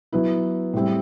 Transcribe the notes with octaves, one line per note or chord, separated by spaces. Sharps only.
F#3 B3 E4
A2 G3 C4